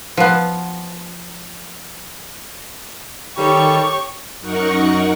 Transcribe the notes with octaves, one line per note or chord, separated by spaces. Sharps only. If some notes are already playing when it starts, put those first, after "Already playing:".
F3 B3
D#3 G3 G4 A4 C#5 C#6
F#2 D#4 A#4 F#5 C#6